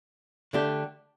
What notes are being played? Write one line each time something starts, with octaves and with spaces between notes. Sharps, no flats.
D3 A3 D4 G4